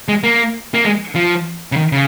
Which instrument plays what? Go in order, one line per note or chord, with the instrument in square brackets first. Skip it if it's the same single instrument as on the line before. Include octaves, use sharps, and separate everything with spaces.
[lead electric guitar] G#3
A#3
A#3
G#3
F3
C#3
D#3
C#3